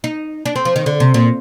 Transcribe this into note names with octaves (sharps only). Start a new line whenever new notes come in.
D#4
D4
C4
F3
D#3
D3
C3
A#2